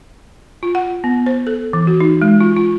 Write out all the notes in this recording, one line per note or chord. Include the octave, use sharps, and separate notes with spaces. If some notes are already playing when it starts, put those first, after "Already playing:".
F4
F#5
B3
C5
A4
E3
F#4
D#4
G#3
F4
F4